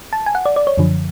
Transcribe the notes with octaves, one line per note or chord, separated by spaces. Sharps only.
A5
G#5
F#5
D5
D5
C#5
F#2 D3 F3